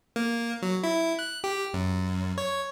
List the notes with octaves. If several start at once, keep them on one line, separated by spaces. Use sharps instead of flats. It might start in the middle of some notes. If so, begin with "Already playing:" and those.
A#3
F#3
E4
F#6
G4
F#2
C#5